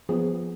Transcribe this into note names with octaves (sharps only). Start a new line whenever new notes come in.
F3 B3 G#4